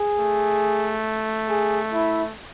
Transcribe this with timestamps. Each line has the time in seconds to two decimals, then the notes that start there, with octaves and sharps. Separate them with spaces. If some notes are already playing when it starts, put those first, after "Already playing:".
Already playing: G#4
0.19 A3
1.49 G#4
1.93 E4